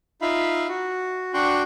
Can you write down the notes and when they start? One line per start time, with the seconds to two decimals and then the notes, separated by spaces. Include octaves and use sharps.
0.22 D#4 F4 E5 F5 B5
0.69 F#4
1.34 D4 F#4 G5 C6 C#6 F#6